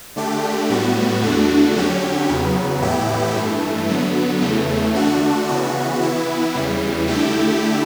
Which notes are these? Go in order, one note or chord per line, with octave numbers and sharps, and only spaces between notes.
D3 A3 D4 G4
A2 G3 B3 F#4
E2 D3 A3 D4 F#4
D3 F#3 C#4 G4
E2 C#3 F#3 B3
A2 E3 B3 E4 G4
G2 E3 A3
D3 F#3 B3
E2 C#3 E3 A3
D3 A3 D4 F#4
C#3 E3 B3 F#4
E3 B3 E4
E2 C#3 E3 G3
D3 A3 E4 G4